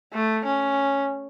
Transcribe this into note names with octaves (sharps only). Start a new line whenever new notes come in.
A3
C#4